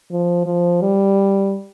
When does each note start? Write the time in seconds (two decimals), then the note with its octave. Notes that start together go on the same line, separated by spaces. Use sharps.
0.11 F3
0.46 F3
0.81 G3